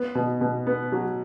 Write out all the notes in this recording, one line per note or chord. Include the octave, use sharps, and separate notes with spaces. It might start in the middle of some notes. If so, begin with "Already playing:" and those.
Already playing: B3
B2
B2
B3
F#3